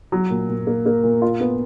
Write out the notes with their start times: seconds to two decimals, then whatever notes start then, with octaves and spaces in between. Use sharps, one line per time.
0.12 F#3
0.30 A#2
0.49 A#2
0.67 A#3
0.86 A#3
1.03 A#2
1.22 F4
1.40 B3